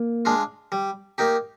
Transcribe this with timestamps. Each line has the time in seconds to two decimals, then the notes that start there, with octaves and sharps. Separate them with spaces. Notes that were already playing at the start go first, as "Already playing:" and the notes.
Already playing: A#3
0.25 G#3 D4 F4
0.72 G3
1.18 A#3 D#4 G4